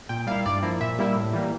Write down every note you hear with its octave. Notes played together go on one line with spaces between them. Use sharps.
A#2 G5
G3 A#3 E4 F5
G2 D5
F3 A#3 E4
A#2 E5
G3 A#3 E4
A2
E3 G3 A#3